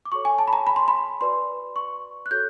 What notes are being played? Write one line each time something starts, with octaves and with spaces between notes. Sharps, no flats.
D6
F#4 A4 C#5 C#6
G#5
A5
B5
A#5
B5
C6
B5
F#4 B4 D5 C6
C#6
F#6
F#4 A4 C#5 G6